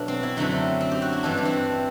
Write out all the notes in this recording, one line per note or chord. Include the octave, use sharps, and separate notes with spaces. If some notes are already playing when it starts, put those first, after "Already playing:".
Already playing: B2 F#3 A3 D4 A4
C4
E4
F#2 D3 F#3 A3 C4
C4
G4
F#4
E4
G2 E3 G3 D4
D4
C4